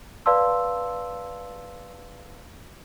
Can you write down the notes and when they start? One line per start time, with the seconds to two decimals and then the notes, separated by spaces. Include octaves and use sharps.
0.26 B4 D5 F5 A5 C6 E6